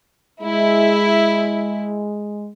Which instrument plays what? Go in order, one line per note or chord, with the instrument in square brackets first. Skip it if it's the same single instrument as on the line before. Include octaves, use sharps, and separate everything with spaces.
[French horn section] G#3 [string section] E4